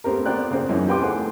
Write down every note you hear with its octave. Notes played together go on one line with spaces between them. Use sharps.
A3 B3 C4 G4 A#4
B3 C4 F4 D5 G5 F#6
C#3 A#3 C4
F#2 E3 C#4 D#4
F4 G4 B4 G5 C6 D6
A3 G#4 C5 F#5